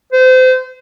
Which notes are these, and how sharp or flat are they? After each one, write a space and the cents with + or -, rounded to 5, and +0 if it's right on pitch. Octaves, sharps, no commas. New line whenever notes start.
C5 -30